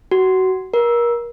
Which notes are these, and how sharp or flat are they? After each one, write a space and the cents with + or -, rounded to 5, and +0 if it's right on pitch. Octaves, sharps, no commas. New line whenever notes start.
F#4 +20
A#4 +30